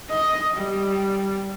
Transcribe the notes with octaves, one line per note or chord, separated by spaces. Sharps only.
D#5
G3